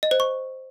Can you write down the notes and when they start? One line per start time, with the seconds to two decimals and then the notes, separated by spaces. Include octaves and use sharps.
0.03 D#5
0.11 C5
0.20 C#6